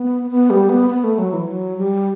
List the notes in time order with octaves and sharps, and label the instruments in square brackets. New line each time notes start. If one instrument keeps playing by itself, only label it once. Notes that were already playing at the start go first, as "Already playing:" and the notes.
Already playing: [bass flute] B3
B3
G3
B3
B3
A3
F#3
E3
F#3
G3